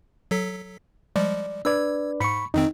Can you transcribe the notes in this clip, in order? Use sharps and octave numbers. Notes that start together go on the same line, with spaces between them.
F#3 A4 B6
F3 G3 G#3 D5
D4 B4 D5 E6 G#6
G#2 B5 C#6 C#7
F2 D#3 C4 D#4